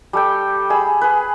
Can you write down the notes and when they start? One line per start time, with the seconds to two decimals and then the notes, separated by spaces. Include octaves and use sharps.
0.13 G3 A4 G5
0.70 G#4 B5 E6
1.01 G#4 B4